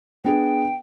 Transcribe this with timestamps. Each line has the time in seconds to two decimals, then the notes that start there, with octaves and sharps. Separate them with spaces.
0.24 B3 D4 G#4 G5